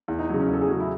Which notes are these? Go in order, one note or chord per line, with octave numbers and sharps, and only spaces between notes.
E2
D#4
C#3 F#3
C#4
E2 A4
G#4
C#3 F#3 F#4
E4